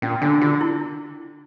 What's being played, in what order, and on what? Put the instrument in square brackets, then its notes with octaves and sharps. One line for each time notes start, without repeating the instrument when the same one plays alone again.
[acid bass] A#2 [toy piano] C#4
[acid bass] D3 [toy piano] D4
[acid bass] D3 [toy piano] F4
[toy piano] E4